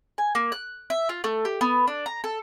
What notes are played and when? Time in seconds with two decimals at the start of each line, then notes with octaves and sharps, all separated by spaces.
0.18 G#5
0.35 A#3
0.52 F#6
0.90 E5
1.09 F4
1.24 A3
1.45 G4
1.61 B3
1.87 D4
2.06 A#5
2.24 A4